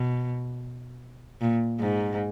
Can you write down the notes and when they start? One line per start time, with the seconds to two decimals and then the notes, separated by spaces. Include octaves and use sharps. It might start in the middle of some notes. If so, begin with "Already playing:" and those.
Already playing: B2
1.41 A#2
1.80 G#2